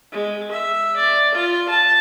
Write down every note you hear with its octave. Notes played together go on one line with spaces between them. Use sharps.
G#3
E5
D5
F4
A5